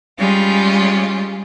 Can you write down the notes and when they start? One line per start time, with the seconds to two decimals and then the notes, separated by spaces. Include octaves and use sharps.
0.17 G3 G#3 C#4 F4 G4